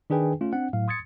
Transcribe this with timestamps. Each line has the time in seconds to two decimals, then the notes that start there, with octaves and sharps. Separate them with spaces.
0.10 D#3 D4 G#4 B4 G5 G#5
0.41 A3 C#4 F4
0.53 C4 D4 F#5
0.73 A2 F#3 F5
0.88 C6 D#6 G#6 A6 C#7